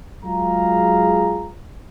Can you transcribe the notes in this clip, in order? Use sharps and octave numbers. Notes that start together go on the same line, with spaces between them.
F#3 G#3 F4 G#4 F5 A#5